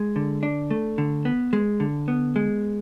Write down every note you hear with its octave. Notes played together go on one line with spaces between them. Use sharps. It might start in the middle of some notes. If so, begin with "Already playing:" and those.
Already playing: G#3
D3
D4
A3
D3
B3
G#3
D3
B3
G#3